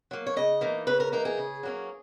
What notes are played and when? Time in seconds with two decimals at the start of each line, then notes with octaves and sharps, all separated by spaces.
0.11 F#3 A#3
0.26 C#5
0.36 C#3 D#5
0.61 E3 A#3 D#4
0.87 C#3 B4
1.00 A#4
1.12 E3 A#3 D#4 A#4
1.25 G#4
1.38 C#3
1.63 F#3 A#3 C#4